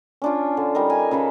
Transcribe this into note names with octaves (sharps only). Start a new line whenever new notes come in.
C#4 D4 F4
D3
G3 D#4 A#4
G#5
C#3 A4 B4 B5